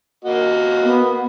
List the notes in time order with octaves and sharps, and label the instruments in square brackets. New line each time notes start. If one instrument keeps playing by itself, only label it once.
[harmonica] A#3 F#4 D#5
[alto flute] B3